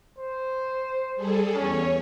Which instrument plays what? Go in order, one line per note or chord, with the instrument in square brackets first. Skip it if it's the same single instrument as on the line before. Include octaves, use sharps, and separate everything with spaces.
[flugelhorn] C5
[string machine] G3 G#4 A4
[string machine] E2 C#5 [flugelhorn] C#4